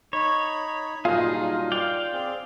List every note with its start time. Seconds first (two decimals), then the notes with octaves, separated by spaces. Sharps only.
0.13 D#4 C#5 B5
1.05 G2 A#2 F#3 D#4 F4 G#4
1.72 D5 F5 G5
2.13 C4 G#4